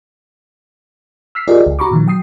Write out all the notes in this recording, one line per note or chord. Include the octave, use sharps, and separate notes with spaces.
E6 F6 B6 C7
F4 G4 G#4 A#4 D5 D#5
C#2
F#4 A#5 B5 C#6 D6
A#2 D#3 F3
F#3 G5 D#6 C7